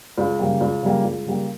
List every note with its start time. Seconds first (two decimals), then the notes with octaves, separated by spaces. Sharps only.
0.18 C#2
0.39 C#3 G3 A#3
0.61 C#2
0.83 C#3 G3 A#3
1.04 C#2
1.26 C#3 G3 A#3